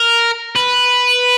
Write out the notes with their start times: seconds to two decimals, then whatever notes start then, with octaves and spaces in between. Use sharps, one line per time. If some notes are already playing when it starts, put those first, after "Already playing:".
Already playing: A#4
0.56 B4